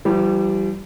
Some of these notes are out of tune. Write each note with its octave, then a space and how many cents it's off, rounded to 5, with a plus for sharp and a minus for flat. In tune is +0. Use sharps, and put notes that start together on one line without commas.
E3 +40 G3 -20